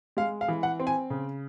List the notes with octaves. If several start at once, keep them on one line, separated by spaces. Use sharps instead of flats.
G#3 F5
F5
E3
F#5
C4
G#5
C#3